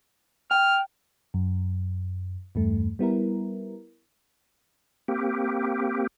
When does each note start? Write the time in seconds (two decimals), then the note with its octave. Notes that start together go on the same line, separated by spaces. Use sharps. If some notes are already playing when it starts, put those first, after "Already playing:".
0.51 G5 F6
1.34 F#2
2.55 E2 G2 A3
2.99 G3 B3 E4 A#4
5.08 A#3 C4 G4